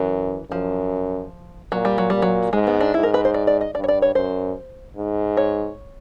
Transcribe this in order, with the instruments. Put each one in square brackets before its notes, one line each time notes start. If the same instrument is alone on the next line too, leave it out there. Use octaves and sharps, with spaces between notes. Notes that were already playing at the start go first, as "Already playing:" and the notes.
Already playing: [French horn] F#2 [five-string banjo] E3
[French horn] F#2 [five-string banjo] F3
[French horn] A#2 [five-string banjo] F#3
[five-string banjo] G3
F#3
[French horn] A#2 [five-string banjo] G3
[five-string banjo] F#3
[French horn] G#2 [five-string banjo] G#3
[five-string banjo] B3
D4
[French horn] G#2 [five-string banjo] E4
[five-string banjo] A#4
B4
C5
D5
D5
D#5
[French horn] G2 [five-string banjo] D5
[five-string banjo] C#5
D5
C#5
[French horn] F#2 [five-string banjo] C5
[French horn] G#2
[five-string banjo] C#5